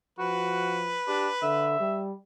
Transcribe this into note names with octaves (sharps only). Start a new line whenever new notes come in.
F3 F#4 B4
D4 G4
D3 E5
G3